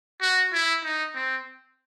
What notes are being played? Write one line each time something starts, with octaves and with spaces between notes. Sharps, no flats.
F#4
E4
D#4
C4